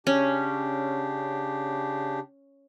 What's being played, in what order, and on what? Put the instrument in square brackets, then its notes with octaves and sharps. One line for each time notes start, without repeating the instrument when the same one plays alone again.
[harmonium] C#3 D4 G4 [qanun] C#4